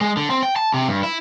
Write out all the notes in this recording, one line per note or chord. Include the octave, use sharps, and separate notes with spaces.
G#3
D3
C4
G5
A5
C3
G2
E4